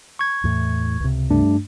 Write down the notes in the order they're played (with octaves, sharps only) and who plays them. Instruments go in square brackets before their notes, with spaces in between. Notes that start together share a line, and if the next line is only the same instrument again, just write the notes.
[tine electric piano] C#6 G#6
[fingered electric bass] E2 A2
C#2 C3
[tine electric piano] G2 A3 D4